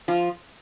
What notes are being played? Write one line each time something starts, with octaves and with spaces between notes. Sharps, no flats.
F3 F4